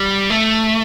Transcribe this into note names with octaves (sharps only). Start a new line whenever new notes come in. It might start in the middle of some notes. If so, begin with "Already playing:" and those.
Already playing: G3
A3